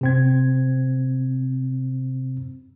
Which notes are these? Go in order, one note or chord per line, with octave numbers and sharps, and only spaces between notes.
C3 C4 G#6